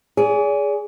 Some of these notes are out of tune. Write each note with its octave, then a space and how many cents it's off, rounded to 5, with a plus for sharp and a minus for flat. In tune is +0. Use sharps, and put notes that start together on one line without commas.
G#4 +0 D5 -40